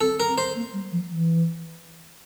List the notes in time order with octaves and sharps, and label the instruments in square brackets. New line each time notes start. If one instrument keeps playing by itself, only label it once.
[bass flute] C4 [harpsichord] A4
[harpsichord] A#4
[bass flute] C4
[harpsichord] C5
[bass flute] A#3
G3
F3
E3